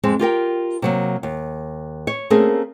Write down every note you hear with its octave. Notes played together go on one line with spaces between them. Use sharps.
F2 G#3 C4
F4 G4 A#4 G5
C3 F#3 A#3
D#2
C#5
A3 A#3 C4 C#4 G#4 A#4